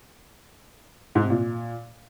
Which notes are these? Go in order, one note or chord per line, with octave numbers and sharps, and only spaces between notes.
G#2
C3
A#2